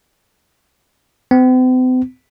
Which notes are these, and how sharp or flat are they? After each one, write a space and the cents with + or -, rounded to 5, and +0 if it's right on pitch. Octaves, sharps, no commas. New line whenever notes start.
C4 -45